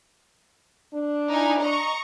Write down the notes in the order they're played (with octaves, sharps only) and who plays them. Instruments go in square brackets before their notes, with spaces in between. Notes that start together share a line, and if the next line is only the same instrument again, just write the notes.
[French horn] D4
[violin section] D#4 E4 G#5
D#5 A#5 C#6